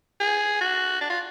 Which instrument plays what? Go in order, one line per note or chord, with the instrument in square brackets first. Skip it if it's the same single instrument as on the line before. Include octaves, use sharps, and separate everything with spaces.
[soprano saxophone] G#4
F#4
D4
F4